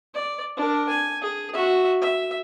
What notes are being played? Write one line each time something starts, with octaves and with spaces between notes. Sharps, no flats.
D5
D4 A#4
G#5
G#4
F#4 E5
E5